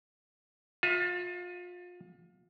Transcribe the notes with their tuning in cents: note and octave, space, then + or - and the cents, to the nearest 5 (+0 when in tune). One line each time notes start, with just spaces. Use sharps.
F4 +30 E5 +0